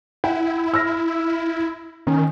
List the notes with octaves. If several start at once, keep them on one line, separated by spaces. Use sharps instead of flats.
E4 F#5 G5
E6 F6 A#6
D#3 C#4